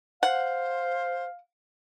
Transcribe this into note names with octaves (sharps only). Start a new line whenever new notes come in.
C5 F5 F#5